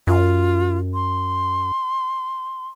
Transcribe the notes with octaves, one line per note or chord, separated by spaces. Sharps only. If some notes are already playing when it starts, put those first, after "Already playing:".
F#2 F4
C6